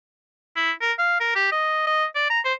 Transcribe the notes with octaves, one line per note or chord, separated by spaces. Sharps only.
E4
A#4
F5
A#4
G4
D#5
D#5
D5
A#5
C5